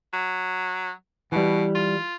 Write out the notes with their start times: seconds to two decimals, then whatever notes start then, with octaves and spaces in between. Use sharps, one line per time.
0.13 F#3
1.32 B2 E3 G3
1.75 F4